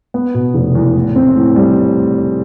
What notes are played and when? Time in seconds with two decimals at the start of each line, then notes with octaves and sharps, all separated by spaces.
0.14 B3
0.34 B2
0.54 F1
0.75 E2
0.95 A2
1.16 C4
1.36 A2
1.56 G3